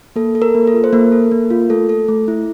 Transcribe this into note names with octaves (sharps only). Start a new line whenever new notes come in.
A#3 A4
A4
A#4
A#3
A4
F4
C5
A#3 A#4
A4
A#3
F4
A3 A4
A4
A3
E4